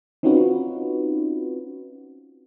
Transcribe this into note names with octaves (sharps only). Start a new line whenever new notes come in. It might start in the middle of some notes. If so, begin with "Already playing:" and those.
C4 C#4 D#4 F4 F#4 B4